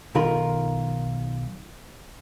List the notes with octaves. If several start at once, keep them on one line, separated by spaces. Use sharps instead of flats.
B1 D#3 F4 A#4 B5